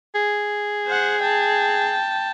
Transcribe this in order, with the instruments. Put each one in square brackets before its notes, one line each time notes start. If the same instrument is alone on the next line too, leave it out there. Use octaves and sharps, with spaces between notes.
[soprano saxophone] G#4
[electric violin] C5 F#5
G5 A5